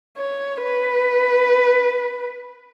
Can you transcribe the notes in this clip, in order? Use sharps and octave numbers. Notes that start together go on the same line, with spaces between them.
C#5
B4